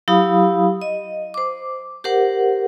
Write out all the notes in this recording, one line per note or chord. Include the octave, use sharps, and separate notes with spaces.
F#3 E4 G4 F5 B5 D#6
D#5
C5 D6
G4 A#4 C5 F#5